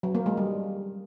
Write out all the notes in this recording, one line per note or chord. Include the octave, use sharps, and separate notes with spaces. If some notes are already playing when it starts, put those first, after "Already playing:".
F#3
A#3
G#3
G3